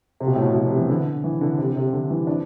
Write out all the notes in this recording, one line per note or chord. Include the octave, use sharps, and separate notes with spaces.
C3
B2
A2
B2
B2
C3
E3
D3
E3
D3
C3
C3
D3
E3
D4